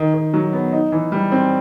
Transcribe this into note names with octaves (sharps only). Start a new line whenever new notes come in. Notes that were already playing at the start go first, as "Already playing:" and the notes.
Already playing: D#3
D#3
F#3
B3
D#4
E3
G3
C4